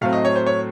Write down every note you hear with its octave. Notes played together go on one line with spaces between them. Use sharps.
A2 F#3 A3 C4 F5
D#5
C#5
C5
C#5